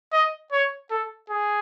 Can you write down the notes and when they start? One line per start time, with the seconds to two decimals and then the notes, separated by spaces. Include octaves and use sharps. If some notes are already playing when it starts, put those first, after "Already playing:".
0.12 D#5
0.52 C#5
0.91 A4
1.30 G#4